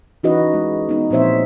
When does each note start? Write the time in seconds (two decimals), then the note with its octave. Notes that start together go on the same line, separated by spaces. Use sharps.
0.23 E3 C#4 D#4 F#4 B4 D#5
0.54 G#3
0.89 B3 D#4
1.11 A#2 F3 C4 C5 C#5 E5